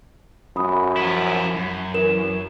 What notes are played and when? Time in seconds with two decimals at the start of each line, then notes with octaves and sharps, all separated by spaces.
0.56 F#2 B5 D#6
0.97 F3 E4
1.56 F#2
1.94 E3 A#4 E7